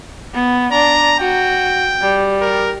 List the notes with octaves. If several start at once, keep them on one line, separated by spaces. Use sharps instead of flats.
B3
D4 A#5
F#4 G5
G3
A#4